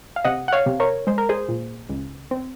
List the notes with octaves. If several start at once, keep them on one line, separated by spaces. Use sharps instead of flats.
F5
C3 D#5 F#5
F#5
C#5 F5
C3
A#4 C#5
G#3 C5
A#4
G#4 C5
A#2
C#2
C4